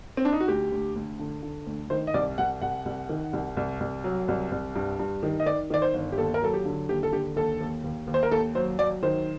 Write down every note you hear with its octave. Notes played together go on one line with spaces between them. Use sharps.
C4
D4
D#4
F#4
D2 G4
D2
D2
D3
D3
D2
D#3 C5
D#5
C2 D5
C2 F#5
C2 F#5
C2
D#3
C2
C2
C2
F#3
C2
C2
G2
G2
D#3
D#5
D#3 D5
D#3 D5
C5
G1
G4
D#2 A4
A#4
F#3 A4
G4
D3
D#2 G4
A4
D3 G4
D#2 A4
D#2
D#2
D#2
C5
A#4
D#2 A4
F#3 C5
F#3 D5
D#3 C5